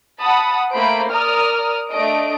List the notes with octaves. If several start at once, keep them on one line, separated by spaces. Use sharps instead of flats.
F#5 A5 B5 D#6
A3 A#3 C5 B5 D7
A#4 D5 A#5 D#6 F6
A3 D4 D#5 D7